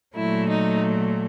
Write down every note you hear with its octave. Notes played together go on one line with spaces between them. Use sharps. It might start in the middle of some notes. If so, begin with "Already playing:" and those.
A#2 F#3 A3 E4
D#4